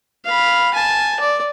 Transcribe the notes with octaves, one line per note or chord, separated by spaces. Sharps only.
F5 B5
G#5 A5
D5